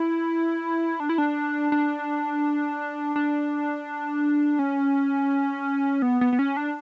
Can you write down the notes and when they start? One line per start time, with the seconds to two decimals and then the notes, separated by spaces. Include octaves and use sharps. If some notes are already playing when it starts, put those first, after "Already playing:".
Already playing: E4
1.00 D4
1.09 E4
1.18 D4
1.72 D4
3.16 D4
4.59 C#4
6.02 B3
6.21 B3
6.33 B3
6.39 C#4
6.57 D4